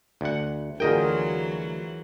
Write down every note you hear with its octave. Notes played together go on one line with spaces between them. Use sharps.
D2 F#5
D2 E3 F#3 F4 G#4 A#4 D#5 G5